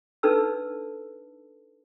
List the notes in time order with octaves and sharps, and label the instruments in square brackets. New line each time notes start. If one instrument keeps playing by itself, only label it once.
[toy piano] D4 D#4 A4 B4 A5 E6